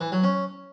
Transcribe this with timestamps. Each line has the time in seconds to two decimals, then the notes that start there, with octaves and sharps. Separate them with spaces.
0.01 E3
0.12 F#3
0.23 C#4